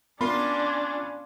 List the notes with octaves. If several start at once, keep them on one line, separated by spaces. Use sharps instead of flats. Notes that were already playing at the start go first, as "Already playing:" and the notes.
B3 C#4 D4 F4 A#4 B5